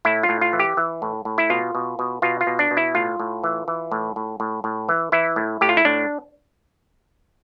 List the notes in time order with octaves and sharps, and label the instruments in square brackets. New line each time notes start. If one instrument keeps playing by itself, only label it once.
[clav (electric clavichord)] A2 E4
F4
A2
F4
E3
G4
E3
A2
A2
E4
B2 F4
B2
B2
B2 F4
F4
B2
D4
B2
E4
A2 F4
A2
E3
E3
A2
A2
A2
A2
E3
E3 E4
A2
A2 G4
F4
E4
A2 D4